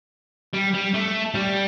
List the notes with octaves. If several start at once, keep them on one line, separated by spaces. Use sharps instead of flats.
G3
G3
A3
G3